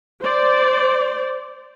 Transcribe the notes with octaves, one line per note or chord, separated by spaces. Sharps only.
C5 D5